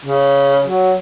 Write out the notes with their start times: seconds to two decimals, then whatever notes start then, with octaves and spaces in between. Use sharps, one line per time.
0.05 C#3
0.65 F#3